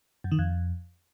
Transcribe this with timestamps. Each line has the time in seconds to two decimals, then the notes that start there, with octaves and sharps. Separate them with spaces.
0.24 F#2
0.32 D#3
0.39 F2